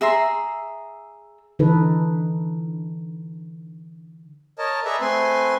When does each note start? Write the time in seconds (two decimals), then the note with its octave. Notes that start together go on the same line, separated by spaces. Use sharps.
0.01 G#4 E5 A#5 C6
1.59 D3 E3 D#4 A4 B4
4.58 A#4 C#5 D#5 A5
4.85 G#4 A4 B4 D5 E5 A#5
5.01 A3 C4 B4 G#5 C6